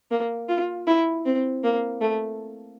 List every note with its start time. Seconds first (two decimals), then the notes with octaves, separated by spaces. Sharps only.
0.11 A#3
0.49 F4
0.87 E4
1.26 C4
1.63 A#3
2.01 A3